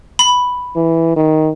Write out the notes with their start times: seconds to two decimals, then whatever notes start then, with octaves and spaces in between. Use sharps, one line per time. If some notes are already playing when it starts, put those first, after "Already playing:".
0.19 B5
0.76 E3
1.16 D#3